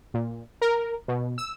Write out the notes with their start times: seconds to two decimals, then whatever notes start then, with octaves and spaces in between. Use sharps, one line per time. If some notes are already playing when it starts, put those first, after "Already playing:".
0.14 A#2
0.61 A#4
1.08 B2
1.38 E6